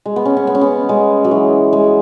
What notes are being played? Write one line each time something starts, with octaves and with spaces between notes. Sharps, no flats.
G#3
B3
C#4
C#4
B3
C#4
B3
G#3
F#3
E3
G#3